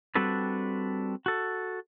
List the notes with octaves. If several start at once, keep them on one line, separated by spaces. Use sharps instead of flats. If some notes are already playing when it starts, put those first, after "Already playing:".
G3 C4 D4 F#4 A4 B4
F#4 A4